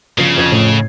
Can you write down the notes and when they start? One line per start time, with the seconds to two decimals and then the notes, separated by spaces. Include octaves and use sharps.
0.18 G1 C#3 F3 C7
0.37 F2 F3 G#6
0.52 A2